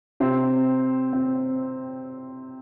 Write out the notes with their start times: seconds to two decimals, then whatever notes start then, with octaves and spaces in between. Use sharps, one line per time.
0.20 C3 C4
1.13 C4